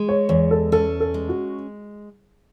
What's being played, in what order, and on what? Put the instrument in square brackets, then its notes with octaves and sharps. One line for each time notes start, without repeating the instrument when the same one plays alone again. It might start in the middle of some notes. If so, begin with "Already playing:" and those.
Already playing: [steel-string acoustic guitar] G#3
[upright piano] C#5
[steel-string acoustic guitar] E2 [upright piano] C#5
[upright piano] A4
[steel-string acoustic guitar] C#4 [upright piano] A4
[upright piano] A4
[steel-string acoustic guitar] G#3
[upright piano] F#4